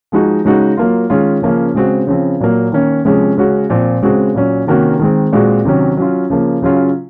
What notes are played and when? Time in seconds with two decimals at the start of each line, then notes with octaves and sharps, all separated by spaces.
0.12 F3 G#3 D#4 F#4
0.45 C#3 G#3 D#4 F#4
0.77 F#3 A#3 F4
1.10 D#3 G#3 C#4 F4
1.42 C#3 F3 A#3 C#4
1.74 C#3 G#3 C4 F#4
2.07 C#3 F3 C4
2.40 A#2 F#3 A#3
2.72 D#3 A#3 C#4
3.05 C3 F3 G#3 C#4
3.38 C#3 G#3 C#4 F#4
3.70 A#2 F3 C4
4.02 C#3 G#3 C4 F#4
4.34 A#2 F#3 C#4
4.67 C3 D#3 A#3 C#4 F#4
4.99 D#3 G#3 C4
5.33 A#2 G#3 C4 F#4
5.65 C3 D#3 F#3 C#4
5.97 F#3 C#4 F4
6.30 C#3 F3 A#3
6.62 C#3 F#3 C#4 F4